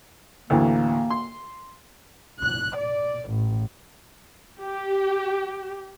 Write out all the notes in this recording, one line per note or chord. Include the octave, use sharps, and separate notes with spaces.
D2 A2 E3 A#3
C6
F#6
D5
A1
G4